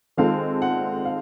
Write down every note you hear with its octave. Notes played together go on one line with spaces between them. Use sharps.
D#3 G#3 C4 F4 A4 F5
F#5
F5